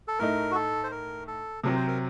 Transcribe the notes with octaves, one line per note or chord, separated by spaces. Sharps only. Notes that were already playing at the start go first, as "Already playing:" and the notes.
A4
A2 A3 D#4 A#4
F#4
A4
C5
A#4
A4
C3 F#3 C4 A#4
C5
A#4